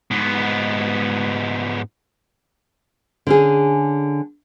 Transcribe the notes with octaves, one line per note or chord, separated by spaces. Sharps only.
G#2 B3
D3 C#4 G#4